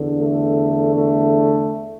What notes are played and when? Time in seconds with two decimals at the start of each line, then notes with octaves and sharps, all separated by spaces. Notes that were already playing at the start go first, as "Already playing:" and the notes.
Already playing: E2 D3
0.15 A3
0.93 A3